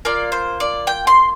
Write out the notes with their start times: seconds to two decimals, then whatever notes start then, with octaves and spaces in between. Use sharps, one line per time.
0.05 A#3 F4 D5
0.32 C5
0.60 D5
0.87 G5
1.07 C6